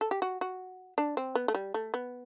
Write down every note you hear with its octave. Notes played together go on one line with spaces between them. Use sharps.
A4
G4
F#4
F#4
D4
C4
B3
A3
G3
A3
B3